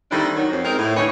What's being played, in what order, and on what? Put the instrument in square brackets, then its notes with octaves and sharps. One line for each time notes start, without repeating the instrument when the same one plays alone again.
[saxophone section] D#3 G3 A3 C4 D4 E4
D#3 F#3
F2
G#3 C4 D#4 A#4
A2
D3 E3 D#4 C#5